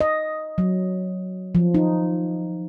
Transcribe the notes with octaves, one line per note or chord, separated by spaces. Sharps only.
D#5
F#3
F3
D#4